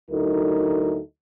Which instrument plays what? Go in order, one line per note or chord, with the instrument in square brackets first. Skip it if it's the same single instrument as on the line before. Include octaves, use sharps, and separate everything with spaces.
[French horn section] D2 F#3 D#4 E4 A4 A#4